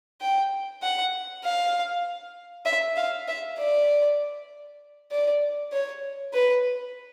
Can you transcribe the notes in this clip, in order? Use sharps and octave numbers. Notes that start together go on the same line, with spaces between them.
G5
F#5
F5
E5
F5
E5
D5
D5
C#5
B4